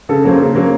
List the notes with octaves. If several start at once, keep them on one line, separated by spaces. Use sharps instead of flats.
C#3 A4
F#3 A#3 C#4 C5
C#3
F#3 A#3 C#4